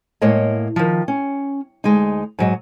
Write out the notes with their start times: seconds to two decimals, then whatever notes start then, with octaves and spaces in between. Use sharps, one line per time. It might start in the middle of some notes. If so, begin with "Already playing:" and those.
0.22 A2 G#3 A#3 C#5 D#5
0.76 D#3 F3
1.08 C#4
1.84 D2 G#3 D#4
2.39 G#2 F#3 D#5